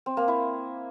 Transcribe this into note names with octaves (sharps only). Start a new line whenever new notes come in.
C4
A#3
E4